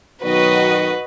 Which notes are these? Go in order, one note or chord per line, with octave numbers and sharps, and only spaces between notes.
B1 D#3 F#3 F#4 B4 D#5